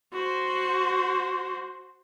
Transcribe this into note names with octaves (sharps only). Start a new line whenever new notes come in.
F#4 C5